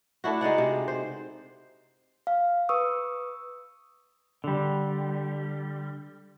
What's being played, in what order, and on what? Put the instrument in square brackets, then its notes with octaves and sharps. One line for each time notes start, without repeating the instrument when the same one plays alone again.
[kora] A3 D4 E4 F#4
G#3 D#4 D5 F#5
C3
C5
[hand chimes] F5
B4 C#6 D#6 E6
[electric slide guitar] D3 G3